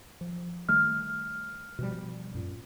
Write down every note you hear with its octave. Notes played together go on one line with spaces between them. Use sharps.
F3
D#3 G3 A3 F6
B2 F3 G3
F#2 A#2